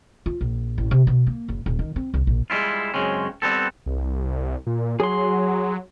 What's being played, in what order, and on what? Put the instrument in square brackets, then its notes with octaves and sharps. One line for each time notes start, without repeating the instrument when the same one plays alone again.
[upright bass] F4
A#1
A1
C3
B2
A#3
F#1
D#1
D#3
C4
C2
A#1
[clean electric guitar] G3 G#3 C#4 E4 F4
F#2 A2 C#3 G#3 C4 C#4
G3 B3 C4 A4
[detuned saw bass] C2
A#2
[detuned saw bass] F#3 [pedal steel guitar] G#4 C6